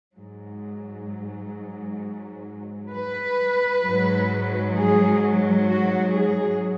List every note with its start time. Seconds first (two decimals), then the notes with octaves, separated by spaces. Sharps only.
0.17 G#2 F#3
2.92 B4
3.85 G#2 F#3
4.76 G#4
5.68 F#4
6.14 G#4